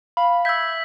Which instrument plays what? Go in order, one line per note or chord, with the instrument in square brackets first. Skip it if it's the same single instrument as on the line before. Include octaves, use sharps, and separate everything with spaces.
[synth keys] F5 [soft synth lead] B5
[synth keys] E5 G6 G#6 [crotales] E6 B6